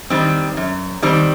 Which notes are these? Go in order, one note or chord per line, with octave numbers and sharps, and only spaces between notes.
D#3 G3 C4
F#2
D#3 G3 C4